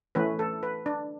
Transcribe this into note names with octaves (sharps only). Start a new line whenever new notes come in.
E3 A3 C#4 B4
A4
B4
D4